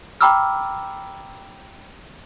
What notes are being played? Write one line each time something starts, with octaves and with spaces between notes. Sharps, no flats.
G5 A#5 B5 D6 E6 F6